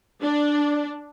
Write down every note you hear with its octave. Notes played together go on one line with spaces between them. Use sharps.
D4